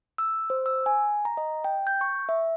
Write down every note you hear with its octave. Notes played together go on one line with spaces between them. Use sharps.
E6
C5
E6
G#5
A#5
D#5
G5
G6
C#6
E5